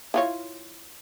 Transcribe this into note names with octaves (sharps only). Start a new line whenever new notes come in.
E4 F4 C#5